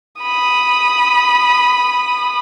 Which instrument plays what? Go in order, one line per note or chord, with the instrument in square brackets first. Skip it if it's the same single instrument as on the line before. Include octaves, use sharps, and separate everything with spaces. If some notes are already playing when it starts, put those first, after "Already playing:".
[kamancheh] B5 D#6